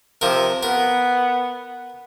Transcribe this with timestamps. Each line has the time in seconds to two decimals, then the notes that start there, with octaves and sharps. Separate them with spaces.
0.21 C3 F3 A#4
0.63 B3 A#4